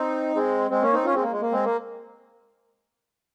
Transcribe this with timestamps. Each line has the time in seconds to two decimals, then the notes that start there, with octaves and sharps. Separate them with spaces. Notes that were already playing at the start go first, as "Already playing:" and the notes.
Already playing: C4 D#4
0.35 G#3 C4
0.70 G#3 C4
0.82 A#3 C#4
0.93 C4 D#4
1.05 C#4 F4
1.14 G#3 C4
1.23 A#3
1.32 G#3
1.41 A#3
1.52 G#3 C4
1.64 A#3